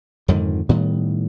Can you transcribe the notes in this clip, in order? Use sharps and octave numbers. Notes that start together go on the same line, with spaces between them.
F2 G#2 D3 D#3
A2 D#3 G3 B3